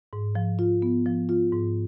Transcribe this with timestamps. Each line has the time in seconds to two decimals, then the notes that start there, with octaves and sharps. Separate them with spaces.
0.13 G#2
0.35 F3
0.59 F4
0.82 B3
1.06 F3
1.29 F4
1.53 G#2